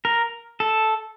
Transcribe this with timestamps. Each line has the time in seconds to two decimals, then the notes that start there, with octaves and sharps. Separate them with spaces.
0.05 A#4
0.60 A4